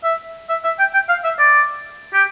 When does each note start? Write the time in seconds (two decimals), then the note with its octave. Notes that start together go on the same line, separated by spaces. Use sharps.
0.04 E5
0.49 E5
0.64 E5
0.79 G5
0.93 G5
1.09 F5
1.24 E5
1.39 D5
2.14 G4